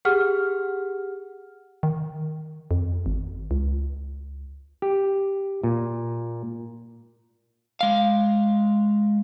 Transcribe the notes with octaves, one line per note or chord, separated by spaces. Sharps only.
G4 G#4 F#5 F6
D#3
F2
G#1
C#2
G4
A#2
G#3 F5